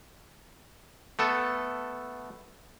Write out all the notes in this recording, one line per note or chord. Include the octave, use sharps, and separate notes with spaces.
A3 B3 A4